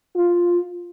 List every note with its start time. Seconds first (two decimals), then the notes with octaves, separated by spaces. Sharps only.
0.16 F4